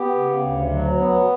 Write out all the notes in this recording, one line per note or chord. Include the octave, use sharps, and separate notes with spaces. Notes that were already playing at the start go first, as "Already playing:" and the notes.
Already playing: B3 G4
C#3
D2
F#3
B3